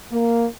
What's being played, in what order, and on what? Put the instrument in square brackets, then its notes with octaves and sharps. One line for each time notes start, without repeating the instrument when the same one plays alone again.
[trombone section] A#3